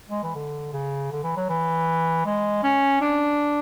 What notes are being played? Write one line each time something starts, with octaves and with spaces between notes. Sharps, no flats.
G#3
E3
D3
C#3
D3
E3
F#3
E3
G#3
C#4
D4